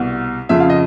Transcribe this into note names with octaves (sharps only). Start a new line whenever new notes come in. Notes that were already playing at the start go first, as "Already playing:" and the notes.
Already playing: C2 B2
F2 C#3 F3 E5
F5
D#5